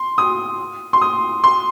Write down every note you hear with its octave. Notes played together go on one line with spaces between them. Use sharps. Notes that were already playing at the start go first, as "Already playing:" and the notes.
Already playing: C6
D#6
C6
D#6
C6